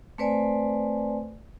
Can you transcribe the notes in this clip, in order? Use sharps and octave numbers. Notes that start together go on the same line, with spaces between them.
A3 C4 B4 C5 D5 G#5